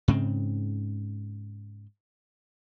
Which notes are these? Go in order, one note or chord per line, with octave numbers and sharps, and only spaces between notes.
G#2 C#3 C4